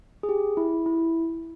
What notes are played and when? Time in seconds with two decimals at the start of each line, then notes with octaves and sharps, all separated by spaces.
0.23 G#4
0.29 G4
0.57 E4
0.86 E4